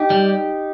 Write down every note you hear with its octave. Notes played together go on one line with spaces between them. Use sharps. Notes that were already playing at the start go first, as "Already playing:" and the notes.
Already playing: D#4 G4
G3